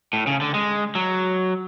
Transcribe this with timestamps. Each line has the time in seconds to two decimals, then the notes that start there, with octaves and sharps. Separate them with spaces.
0.13 A2
0.27 C#3
0.41 D3
0.54 G#3
0.95 F#3